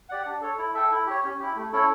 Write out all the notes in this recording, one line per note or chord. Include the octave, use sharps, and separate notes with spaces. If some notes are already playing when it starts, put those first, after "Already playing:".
G4 D5 F#5
D4
A4 C#5
E4
A4 E5 G5
E4
G4 C#5
C#4
E4 G4
A3
C#4 E4 A4 C#5